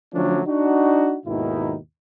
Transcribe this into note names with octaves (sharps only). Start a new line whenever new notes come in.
D3 F3 F#3 A3 C#4 D4
D4 D#4 F#4
D#2 G#2 B2 D#3 D#4 E4